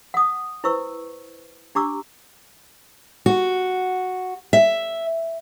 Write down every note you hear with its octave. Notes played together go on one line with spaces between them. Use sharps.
F#5 D#6
E4 B4 C5 C#6 E6
D4 G4 A#5 C#6 D6 E6
F#4
E5